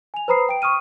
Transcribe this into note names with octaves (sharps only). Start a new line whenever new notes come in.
G#5 F7
B4 C5 A#5 B5 D#6 C7
G5 D7
C#6 D#6 F6 D#7